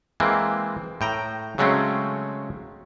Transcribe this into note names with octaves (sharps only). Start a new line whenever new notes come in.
E3 G#3 A#3 C4
A2 G5 A#5
C#3 F#3 G#3 A3 C4 C#4